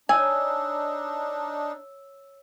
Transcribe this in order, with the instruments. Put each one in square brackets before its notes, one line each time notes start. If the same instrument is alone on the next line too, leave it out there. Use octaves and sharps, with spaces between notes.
[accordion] D4 D#4 [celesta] C#5 E6 [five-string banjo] G#5